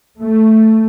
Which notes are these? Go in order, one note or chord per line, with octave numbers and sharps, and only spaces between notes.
A3